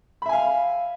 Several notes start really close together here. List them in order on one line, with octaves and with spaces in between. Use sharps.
B5 E5 G#5 F5